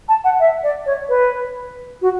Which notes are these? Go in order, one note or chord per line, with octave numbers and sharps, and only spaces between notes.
A5
F#5
E5
D5
C#5
B4
F#4